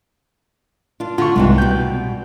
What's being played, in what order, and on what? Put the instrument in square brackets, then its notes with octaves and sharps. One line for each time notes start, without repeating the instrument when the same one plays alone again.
[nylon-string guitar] D4 F4
[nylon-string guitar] D3 [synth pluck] F4 C#6
[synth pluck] C2 [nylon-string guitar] G#2 C3 E3
[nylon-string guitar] B2 G3 [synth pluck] G6